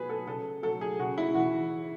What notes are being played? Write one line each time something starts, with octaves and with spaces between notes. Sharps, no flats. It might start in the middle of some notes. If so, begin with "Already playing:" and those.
Already playing: B2 F#3 G#4 B4
A4
C#3 A4
F#3 A4
G#4
C#3 F#4
E4
E3 F#4